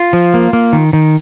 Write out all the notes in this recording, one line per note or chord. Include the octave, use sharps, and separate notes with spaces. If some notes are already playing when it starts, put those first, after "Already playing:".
Already playing: F4
F3
A#3
A#3
D#3
D#3